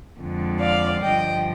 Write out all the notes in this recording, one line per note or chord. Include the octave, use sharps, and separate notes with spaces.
F2 D3 G#3
D5 F5
G2 D3 F3 D#5 G5